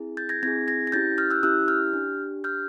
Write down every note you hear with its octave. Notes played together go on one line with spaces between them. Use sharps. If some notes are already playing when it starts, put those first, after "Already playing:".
Already playing: C4 E4 G#4
G6 A6
G#6 A#6
C4 E4 G#4 G#6 A#6
G#6 A#6
A#6
C#4 E4 G4 G6 A6
F6 G6
E6 F#6
C#4 E4 G4 E6 F#6
F6 G6
D4 G4
D4 G4 F6 G6